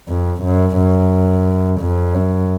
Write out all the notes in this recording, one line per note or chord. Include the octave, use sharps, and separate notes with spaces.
F2
F#2
F#2
F2
F#2